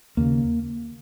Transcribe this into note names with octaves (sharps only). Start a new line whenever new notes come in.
D#2 C#3 A#3